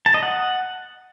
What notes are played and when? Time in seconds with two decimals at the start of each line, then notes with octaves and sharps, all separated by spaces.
0.06 A5
0.14 D#5
0.23 F#5